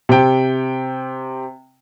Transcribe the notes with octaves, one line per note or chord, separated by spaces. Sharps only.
C3 G5